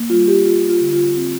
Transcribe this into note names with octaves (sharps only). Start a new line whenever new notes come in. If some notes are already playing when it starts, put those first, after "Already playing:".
Already playing: A#3
G3 F4
G4
F4
F4
D3
F4
C4